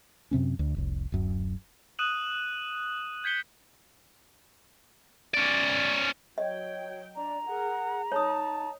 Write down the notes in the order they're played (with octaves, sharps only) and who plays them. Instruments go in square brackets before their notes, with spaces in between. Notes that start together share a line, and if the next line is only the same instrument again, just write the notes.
[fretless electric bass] F#2 C3 C4 C#4
D2
F1 C2
D1 F#2
[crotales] D#6 F#6 D#7 E7 F#7
G6 G#6 B6 C#7 G7
[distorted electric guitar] C#4 D5
[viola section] F#3 G5 [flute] C#5 [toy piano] D#5
[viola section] D4 [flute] D5 [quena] A#5
[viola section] G#4 A#4 [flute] F#5
[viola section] D#4 [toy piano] C#5 D#6 [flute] A5